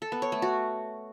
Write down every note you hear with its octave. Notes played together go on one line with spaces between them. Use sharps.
A4
B3
C#5
A3
F#4